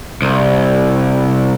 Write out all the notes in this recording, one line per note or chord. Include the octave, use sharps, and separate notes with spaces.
C2